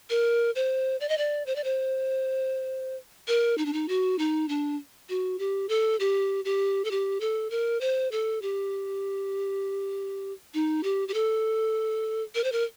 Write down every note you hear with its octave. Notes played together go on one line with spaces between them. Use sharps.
A#4
C5
D5
D#5
D5
C5
D5
C5
A#4
D#4
D4
D#4
F#4
D#4
D4
F#4
G4
A4
G4
G4
A4
G4
A4
A#4
C5
A4
G4
D#4
G4
G4
A4
A#4
C5
A#4